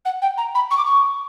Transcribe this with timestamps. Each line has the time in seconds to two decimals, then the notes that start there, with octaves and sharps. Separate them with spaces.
0.05 F#5
0.22 G5
0.37 A#5
0.55 B5
0.70 C#6
0.77 D6
0.85 C#6